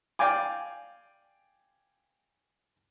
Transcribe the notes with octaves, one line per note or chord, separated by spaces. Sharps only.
D5 F5 G5 G#5 D6